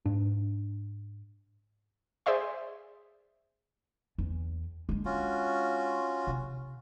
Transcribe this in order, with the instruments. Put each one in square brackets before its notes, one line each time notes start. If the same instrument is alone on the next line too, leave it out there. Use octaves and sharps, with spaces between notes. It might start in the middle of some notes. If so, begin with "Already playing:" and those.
[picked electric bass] G#2 D4
[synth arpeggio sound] G#4 C5 D5 E5 C6
[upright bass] E2
G#3 D4
[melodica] C#4 F4 F#4
[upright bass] C3